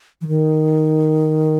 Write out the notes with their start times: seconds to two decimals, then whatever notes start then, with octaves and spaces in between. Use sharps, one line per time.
0.21 E3
0.27 D#3